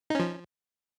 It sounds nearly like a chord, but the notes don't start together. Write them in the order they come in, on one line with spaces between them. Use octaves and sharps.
D#4 C#4 F3